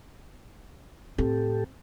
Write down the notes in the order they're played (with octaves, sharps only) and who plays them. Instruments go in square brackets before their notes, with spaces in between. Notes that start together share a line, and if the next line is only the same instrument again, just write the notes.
[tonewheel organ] A2 G4 A4 [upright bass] C4